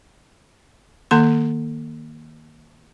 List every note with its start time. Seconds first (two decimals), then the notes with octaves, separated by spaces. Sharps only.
1.11 D#3 A#3 C6